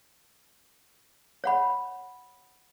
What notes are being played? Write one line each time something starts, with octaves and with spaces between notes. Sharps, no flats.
C#5 F#5 B5